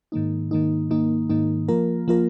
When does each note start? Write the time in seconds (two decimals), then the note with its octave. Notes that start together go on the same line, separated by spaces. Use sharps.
0.12 G#2 D#3 A#3 D#4
0.51 G#2 D#3 A#3 D#4
0.90 G#2 D#3 A#3 D#4
1.29 G#2 D#3 A#3 D#4
1.68 F3 A#3 F4 A#4
2.08 F3 A#3 F4 A#4